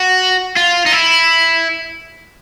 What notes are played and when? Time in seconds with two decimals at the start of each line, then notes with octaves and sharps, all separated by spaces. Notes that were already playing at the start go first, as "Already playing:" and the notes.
Already playing: F#4
0.56 F4
0.86 D#4
0.92 E4